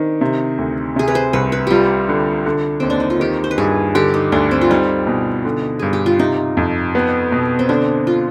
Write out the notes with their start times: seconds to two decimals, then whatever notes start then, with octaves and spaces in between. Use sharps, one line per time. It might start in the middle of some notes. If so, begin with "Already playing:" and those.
Already playing: D#3 C4 D4
0.21 C3
0.58 D2
0.96 C3 G#4
1.08 B4
1.15 C5
1.33 C2 B4
1.52 B4
1.67 G3 F4 G4
2.09 D3
2.46 D3
2.80 D#2 C4
2.90 D4
3.00 D#4
3.10 F4
3.20 D#3 G4
3.44 C5
3.51 B4
3.58 G2 G#4
3.95 D3 G4
4.14 D#4
4.32 D2 D4
4.51 C4
4.61 F4
4.70 G3 D#4
5.07 B2
5.45 D3
5.79 G2 G#4
5.93 G4
6.06 F4
6.19 C3 D#4
6.57 F2
6.95 B3
7.32 B2
7.59 C4
7.69 D3 D4
8.07 F4